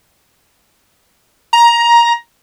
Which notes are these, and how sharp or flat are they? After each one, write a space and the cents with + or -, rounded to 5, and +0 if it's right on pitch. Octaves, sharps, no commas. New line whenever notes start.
A#5 +15